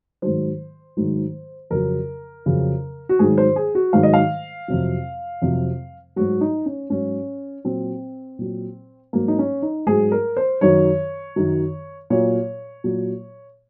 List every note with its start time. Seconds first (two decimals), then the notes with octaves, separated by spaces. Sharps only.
0.22 G#2 D#3 F#3 C5
0.97 G#2 D#3 F#3
1.70 F2 C#3 F#3 A#4
2.46 F2 C#3 F#3
3.09 F#4
3.19 G#2 D#3 F#3 G#4
3.38 C5
3.56 G#4
3.75 F#4
3.93 G#2 D#3 F#3 F5
4.03 D#5
4.14 F5
4.68 F2 C3 F#3
5.42 F2 C3 F#3
6.16 G#2 F#3 F#4
6.41 D#4
6.66 C#4
6.90 G#2 F#3 C#4
7.64 A#2 F#3 C4
8.39 A#2 F#3
9.13 G#2 F#3 A#3
9.28 D#4
9.39 C#4
9.62 D#4
9.87 G#2 F#3 G#4
10.12 A#4
10.37 C5
10.61 F#2 D#3 F#3 C#5
11.36 F#2 D#3 F#3
12.10 A#2 F#3 C#5
12.84 A#2 F#3